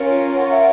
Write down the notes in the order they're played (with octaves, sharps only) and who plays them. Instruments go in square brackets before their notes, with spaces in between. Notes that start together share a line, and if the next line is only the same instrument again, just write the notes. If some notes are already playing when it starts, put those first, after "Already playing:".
Already playing: [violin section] C#4 F4 A#4 C#5
[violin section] F4 A#4 C#5 [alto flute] F#5
[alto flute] E5